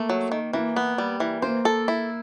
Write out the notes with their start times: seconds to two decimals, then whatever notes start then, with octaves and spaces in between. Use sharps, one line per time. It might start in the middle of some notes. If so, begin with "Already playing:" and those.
Already playing: A3 A#3
0.10 F#3
0.32 D#3
0.53 E3 A#3
0.76 B3
0.98 G3
1.20 E3
1.42 A#3 C5
1.65 A4
1.88 E4